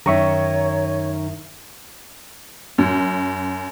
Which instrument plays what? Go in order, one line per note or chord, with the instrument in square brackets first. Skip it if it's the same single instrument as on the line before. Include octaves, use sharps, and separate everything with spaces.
[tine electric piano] F#2 E5 [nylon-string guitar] D#3 [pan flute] C#5 [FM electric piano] A#5 C#6
[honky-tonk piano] F#2